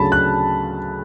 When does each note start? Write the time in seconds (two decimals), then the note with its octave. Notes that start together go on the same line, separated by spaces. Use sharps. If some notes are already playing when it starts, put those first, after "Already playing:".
Already playing: D2 C#3 F#3 A5 B5
0.12 F#6